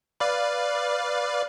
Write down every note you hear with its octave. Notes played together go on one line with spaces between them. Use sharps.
B4 D5 F5